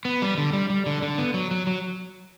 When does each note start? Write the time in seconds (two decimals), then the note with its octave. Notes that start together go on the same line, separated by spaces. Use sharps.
0.05 B3
0.22 G3
0.38 D3
0.53 G3
0.70 G3
0.86 D3
1.02 D3
1.18 B3
1.34 F#3
1.51 F#3
1.67 F#3